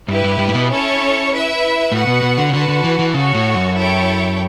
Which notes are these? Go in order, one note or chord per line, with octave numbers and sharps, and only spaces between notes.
G2 E4 G4 B4
G2
G2
A2
B2
C#4 E4 A4 C#5
E4 B4 E5
A2 F#4 B4 F#5
B2
B2
D3
C#3
D3 F#4 B4 F#5 A5
D3
E3
E3
C#3 F#4 A4 C#5
A2
F#2
E4 A4 C#5 G5